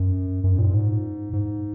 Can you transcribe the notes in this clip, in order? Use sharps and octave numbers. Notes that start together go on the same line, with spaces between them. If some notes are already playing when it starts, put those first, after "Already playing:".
Already playing: F#2
F#2
A#2
G#2
G#2